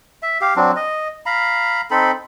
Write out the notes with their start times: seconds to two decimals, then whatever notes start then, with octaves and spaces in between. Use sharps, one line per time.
0.23 E5
0.41 G4 F5
0.56 F#3 C4 D4
0.76 D#5
1.26 F5 A#5 B5
1.91 C4 D#4 A4 B5